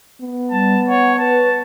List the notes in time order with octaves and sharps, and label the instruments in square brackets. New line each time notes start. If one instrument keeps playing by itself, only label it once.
[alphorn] B3
[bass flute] G3 [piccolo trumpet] A5
[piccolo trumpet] C#5 [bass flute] F#5
[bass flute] B4 [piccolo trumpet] A5